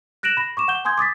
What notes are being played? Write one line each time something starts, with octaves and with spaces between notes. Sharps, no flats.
F#6 A#6 D7 E7 F#7
B5 A#6
C#6 D6 E7
F#5 G6 G7
G#5 C6 D#6 G6 G#6
D6 D#6 A6 B6